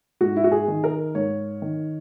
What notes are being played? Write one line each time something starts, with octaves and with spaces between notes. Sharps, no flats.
G#2 F#4
E4
F#4
G#4
D#3
A#4
G#2 C#5
D#3